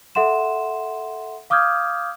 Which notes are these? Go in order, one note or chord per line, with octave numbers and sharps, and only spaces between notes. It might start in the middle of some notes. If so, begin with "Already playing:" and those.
A4 E5 F#5 C6 E7
F5 D6 D#6 F6 G6 G#6